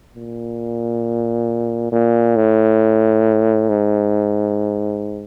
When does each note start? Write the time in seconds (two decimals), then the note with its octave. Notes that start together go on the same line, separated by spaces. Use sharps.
0.15 A#2
1.92 A#2
2.36 A2
3.69 G#2